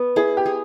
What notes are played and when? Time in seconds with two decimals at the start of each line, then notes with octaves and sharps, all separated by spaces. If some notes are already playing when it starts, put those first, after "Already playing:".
Already playing: B3
0.16 E4 G#4
0.37 G4
0.46 G#4